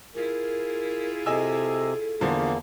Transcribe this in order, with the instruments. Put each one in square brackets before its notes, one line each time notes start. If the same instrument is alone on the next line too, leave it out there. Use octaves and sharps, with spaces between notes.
[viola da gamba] E4 F4 G#4 [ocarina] A#4
[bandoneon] C3 [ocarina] A4 [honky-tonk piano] D#5 G#5 E6
[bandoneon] E2 A#3 [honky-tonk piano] D3 F3